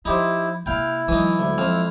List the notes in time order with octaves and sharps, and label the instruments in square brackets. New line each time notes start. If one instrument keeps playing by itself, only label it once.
[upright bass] F3 [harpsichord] D#4 G4 C5 [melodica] E4
[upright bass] C3 A#3 [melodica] E4 [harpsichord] F5 G5
[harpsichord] E3 D#4 [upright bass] F#3 G#3
[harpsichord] D2
F2 C4 F5